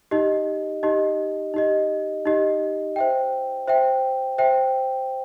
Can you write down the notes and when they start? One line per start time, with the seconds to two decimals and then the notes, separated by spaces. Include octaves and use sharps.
0.11 D#4 G4 D#5
0.83 D#4 G4 D#5
1.54 D#4 G4 D#5
2.26 D#4 G4 D#5
2.96 C5 E5 G5
3.68 C5 E5 G5
4.38 C5 E5 G5